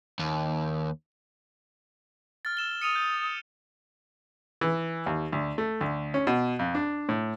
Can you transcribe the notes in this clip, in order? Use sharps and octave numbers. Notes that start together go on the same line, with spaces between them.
D#2
F6 A6
E6 E7 G7
D#6 C#7 D#7 F7
G6
E3
D#2
D2
A3
D2
C#4
B2
F2
D4
A2